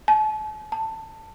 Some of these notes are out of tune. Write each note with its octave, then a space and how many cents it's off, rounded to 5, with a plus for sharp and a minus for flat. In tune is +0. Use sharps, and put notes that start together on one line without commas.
A5 -40
A5 +15